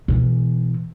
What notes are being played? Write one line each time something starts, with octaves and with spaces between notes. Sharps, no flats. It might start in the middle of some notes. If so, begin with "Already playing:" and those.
B2 E3